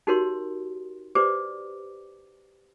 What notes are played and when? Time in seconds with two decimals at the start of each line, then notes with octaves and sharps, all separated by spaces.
0.07 D#4 F#4 G4 A#4 C#5 C6
1.15 G4 B4 C5 D5 D6